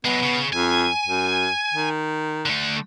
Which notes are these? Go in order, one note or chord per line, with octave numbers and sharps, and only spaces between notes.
F#3 G#3 B3
C#3
F2 G#5
F#2
D#3
D3 A3